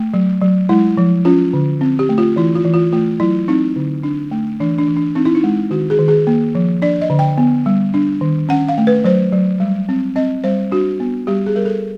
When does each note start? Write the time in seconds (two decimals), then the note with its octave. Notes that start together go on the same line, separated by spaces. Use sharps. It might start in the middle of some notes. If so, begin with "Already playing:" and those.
Already playing: A3
0.14 F#3
0.41 F#3
0.69 G#3 E4
0.97 F3
1.25 C#4 F4
1.53 D3
1.81 C4
1.99 G4
2.09 A3
2.18 F4
2.36 E3 E4
2.55 F4
2.65 E3
2.74 F4
2.93 A3 F4
3.20 F#3 E4
3.48 C4 D#4
3.76 D3
4.03 D4
4.31 A3
4.60 E3 D4
4.78 D4
4.88 E3
4.96 D4
5.15 C4 D#4
5.25 E4
5.35 D#4
5.44 G#3
5.70 D#3 F#4
5.90 G#4
5.98 D#3
6.08 G#4
6.27 A#3
6.55 F3
6.82 D4 D5
7.01 D#5
7.10 D3
7.19 G5
7.38 B3
7.66 G3
7.94 D4
8.21 D#3
8.49 C#4 F#5
8.69 F5
8.78 A3
8.87 B4
9.04 F#3 C5
9.33 F#3
9.60 G3
9.89 C4
10.16 C4 D#5
10.44 G3 C5
10.71 D4 F#4
11.00 B3
11.27 G3 G4
11.46 G#4
11.56 G3 A#4
11.65 A4